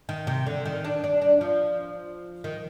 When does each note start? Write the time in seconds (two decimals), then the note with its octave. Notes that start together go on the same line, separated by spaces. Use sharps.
0.09 D#3
0.27 C3
0.46 D3
0.66 D#3
0.84 D4
1.04 D4
1.22 D4
1.41 F3
2.44 D#3